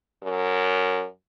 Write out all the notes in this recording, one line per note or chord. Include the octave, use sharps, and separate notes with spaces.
F#2